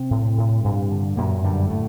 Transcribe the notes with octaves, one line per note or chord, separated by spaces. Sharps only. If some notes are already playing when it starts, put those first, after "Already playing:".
Already playing: C3 C4
A2
A2
G2
D3
F#2 A#2 A#3
G2 D3 G3
A2 A3